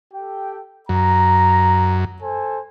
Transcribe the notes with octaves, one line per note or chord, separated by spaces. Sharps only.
G4 A4 G5
F#2 A#5
A4 C5 G#5